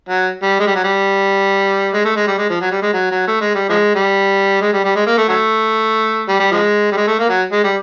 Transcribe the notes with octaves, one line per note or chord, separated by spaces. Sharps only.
F#3
G3
G#3
G3
F#3
G3
G#3
A3
G#3
G3
G#3
F3
F#3
G3
G#3
F#3
F#3
A3
G#3
G3
F3 G#3
G3
G#3
G3
G3
G#3
A#3
A3
F#3 A3
G3
G3
F3 G#3
G3
G#3
A3
A#3
F#3
G#3
G3